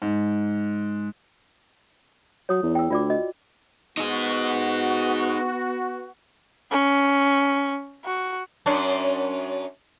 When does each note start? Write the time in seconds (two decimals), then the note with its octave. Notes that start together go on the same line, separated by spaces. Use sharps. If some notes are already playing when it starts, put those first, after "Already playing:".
0.02 G#2
2.49 F#3 C#5 D#6
2.62 E2
2.75 G5 E6
2.90 D2 F4 D5 D6
3.10 F#4 D#5
3.98 B3 D#4 F#4 G#4
6.71 C#4
8.05 F#4
8.66 F#2 C#4 D4